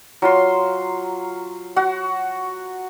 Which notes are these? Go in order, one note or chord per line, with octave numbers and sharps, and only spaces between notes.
F#3 F4 C6
F#4 F#5